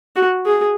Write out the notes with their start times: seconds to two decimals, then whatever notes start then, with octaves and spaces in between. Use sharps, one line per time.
0.16 F#4
0.46 G#4